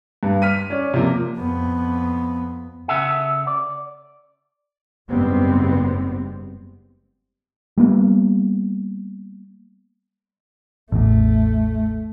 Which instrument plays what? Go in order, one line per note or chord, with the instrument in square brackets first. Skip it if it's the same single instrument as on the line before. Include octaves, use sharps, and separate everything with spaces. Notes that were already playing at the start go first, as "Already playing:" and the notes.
[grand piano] G2
F6 B6 D#7
C#4 D5
C3 F3 A#3
[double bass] F2 B3
[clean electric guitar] C#3 A4 E5 F#5
D5
[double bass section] F#1 G#2 G3 B3 C4
[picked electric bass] G3 A#3 B3
[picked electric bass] A1 E2 [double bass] A3